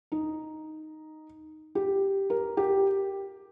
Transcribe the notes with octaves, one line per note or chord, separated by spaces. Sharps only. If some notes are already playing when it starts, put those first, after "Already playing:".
D#4
G4
A#4
G4